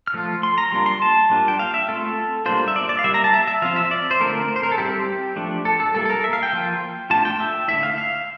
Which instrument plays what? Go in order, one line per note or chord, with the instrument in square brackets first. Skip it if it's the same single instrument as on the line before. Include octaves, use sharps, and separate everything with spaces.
[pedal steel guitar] F6
F3 A3 F4
C6
A#5
G3 A#3 D4 F4 C6
C6
A5
G3 A#3 D4 F4
G5
F5
E5
A3 C4 F4 A4
G3 A#3 D4 F4 C5
E5
D5
D5
F5
G3 A#3 E4 E5
A#5
A5
E5
E5
F3 C4 F4 F5
E5
D5
C5
D3 A3 C4 F4 A#4
C5
A#4
A4
G3 C4 E4 G4
F3 A3 D4
A4
A4
G3 A#3 E4 A4
A4
A#4
E5
F5
G5
F3 A#3 F4
A3 D4 F4 A5
G5
E5
D3 A3 E4 E5
F5
F5